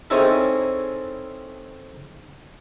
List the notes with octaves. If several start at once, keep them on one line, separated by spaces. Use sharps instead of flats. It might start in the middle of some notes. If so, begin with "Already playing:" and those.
C4 C#4 D#4 E4 G#4 A4